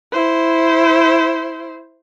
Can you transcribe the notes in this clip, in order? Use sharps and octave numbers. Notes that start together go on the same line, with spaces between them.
E4 C5